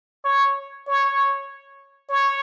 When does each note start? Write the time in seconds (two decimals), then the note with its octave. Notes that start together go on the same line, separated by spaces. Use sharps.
0.25 C#5
0.87 C#5
2.09 C#5